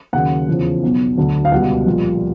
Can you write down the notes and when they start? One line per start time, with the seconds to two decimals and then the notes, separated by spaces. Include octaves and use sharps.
0.13 D#2 C#3 F#3 F#5
0.48 E2 C#3 F3
0.83 B1 B2 F#3
1.17 D2 D3 F#3
1.45 F5
1.52 C#2 B2 G3 F#5
1.86 A#1 A#2 G3